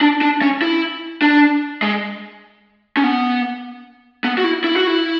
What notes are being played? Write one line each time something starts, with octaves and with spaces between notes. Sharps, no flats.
D4
D4
C#4
E4
D4
G#3
C#4
B3
B3
F#4
E4
E4
F#4
E4